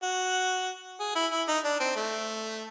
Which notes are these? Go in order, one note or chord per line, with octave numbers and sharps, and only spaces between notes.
F#4
G#4
E4
E4
D#4
D4
C4
A3